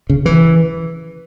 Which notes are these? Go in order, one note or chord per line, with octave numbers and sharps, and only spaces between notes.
C#3
E3